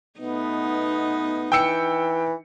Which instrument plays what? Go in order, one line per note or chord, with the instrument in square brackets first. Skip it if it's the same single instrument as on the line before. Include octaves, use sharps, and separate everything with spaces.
[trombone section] B2 A3 B3 [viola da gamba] D#4
[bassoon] E3 [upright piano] G5 E6 C#7